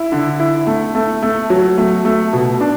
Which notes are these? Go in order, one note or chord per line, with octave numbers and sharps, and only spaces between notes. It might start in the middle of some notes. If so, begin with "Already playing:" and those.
Already playing: E4
D3
E4
A3
A3
A3
F#3
A3
A3
B2
D4